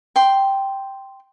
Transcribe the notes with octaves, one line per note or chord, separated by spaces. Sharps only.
G5 C6